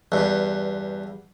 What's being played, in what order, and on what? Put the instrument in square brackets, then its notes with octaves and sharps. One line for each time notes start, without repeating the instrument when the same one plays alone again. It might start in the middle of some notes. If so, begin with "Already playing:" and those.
[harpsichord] E2 G2